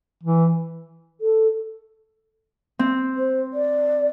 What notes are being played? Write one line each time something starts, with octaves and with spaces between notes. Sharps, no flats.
E3
A4
C4
C5
D5